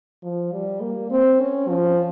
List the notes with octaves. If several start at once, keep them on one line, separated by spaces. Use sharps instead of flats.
F3
G3
A#3
C4
C#4
F3